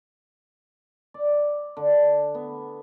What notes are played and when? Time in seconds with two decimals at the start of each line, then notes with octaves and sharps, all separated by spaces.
1.14 D5
1.77 D3
2.35 B3